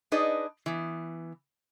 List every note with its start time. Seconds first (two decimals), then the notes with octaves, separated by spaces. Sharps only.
0.12 D4 D#4 G#4 B4 D5 D#5
0.66 E3 B3